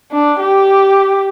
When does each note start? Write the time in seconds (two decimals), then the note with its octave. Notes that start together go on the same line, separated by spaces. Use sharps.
0.11 D4
0.40 G4